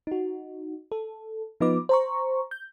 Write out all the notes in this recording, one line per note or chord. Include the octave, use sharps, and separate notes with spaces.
D#4 F#4
A4
F3 B3 D#4 F4 B4 D6
C5 A#5 C#6
G6